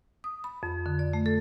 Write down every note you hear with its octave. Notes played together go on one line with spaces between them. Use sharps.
D#6
B5
F2
D3
D5
A3
A4